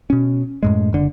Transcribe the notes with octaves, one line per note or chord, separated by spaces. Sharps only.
B2 C#4
F#2 A2 G#3
F#1 D3